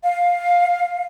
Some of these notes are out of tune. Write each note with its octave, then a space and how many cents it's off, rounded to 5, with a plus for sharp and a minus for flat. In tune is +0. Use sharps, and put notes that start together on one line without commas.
F5 +10